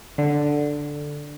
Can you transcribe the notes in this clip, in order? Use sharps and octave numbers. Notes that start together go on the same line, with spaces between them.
D3